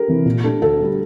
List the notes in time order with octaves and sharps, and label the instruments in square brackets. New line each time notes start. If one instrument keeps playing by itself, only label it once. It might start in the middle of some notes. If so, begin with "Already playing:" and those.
Already playing: [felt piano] G4 A4 A#4
[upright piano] C3 E3
A#2
A3 D4 G4
[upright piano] D2 [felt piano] A4
[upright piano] D3 G3